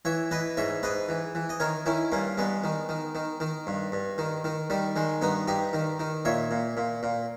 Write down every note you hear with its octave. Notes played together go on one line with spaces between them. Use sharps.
E3 C#5 E5
E3 B4 D#5
G#2 C#5 E5
G#2 B4 D#5
E3
E3
D#5
D#3 A#4 C#5
D#3 C#4 E4
G2 A#3 C#4
G2 G#3 B3
D#3
D#3
D#3
D#3
G2
G2
D#3
D#3
D#3 G3
D#3 G#3
G2 B3 D#4
G2 D#4 G4
D#3
D#3
A#2 C#5 E5
A#2
A#2
A#2